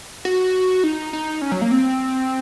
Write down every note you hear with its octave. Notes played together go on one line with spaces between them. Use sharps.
F#4
D#4
D#4
C#4
F#3
A#3
C4